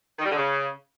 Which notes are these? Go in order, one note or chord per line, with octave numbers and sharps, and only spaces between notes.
D#3
G3
D3
C#3